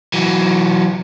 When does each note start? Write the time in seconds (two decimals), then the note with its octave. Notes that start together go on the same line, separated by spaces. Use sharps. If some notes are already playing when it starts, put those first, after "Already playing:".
0.14 E3 F#3